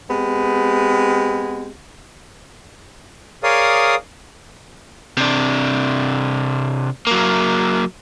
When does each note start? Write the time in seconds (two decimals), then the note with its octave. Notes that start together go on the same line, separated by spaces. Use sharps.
0.09 G#3 B3 C4 G4
3.43 G#4 A#4 C#5 D5 F5 D#6
5.17 C3 D4
7.07 F#3 A#3